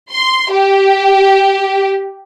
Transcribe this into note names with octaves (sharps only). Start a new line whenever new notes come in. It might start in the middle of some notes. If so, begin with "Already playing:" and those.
C6
G4